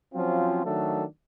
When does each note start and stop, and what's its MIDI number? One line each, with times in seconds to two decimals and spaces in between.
0.14 0.63 53
0.14 0.63 54
0.14 0.63 60
0.14 0.63 61
0.14 0.63 65
0.64 1.04 51
0.64 1.04 54
0.64 1.04 57
0.64 1.04 62
0.64 1.04 69